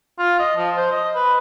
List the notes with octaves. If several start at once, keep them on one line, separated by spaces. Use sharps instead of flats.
F4
D#5
F3
C5
D#5
B4